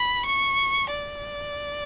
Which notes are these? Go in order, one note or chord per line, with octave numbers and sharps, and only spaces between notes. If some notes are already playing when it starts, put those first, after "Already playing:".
Already playing: B5
C#6
D5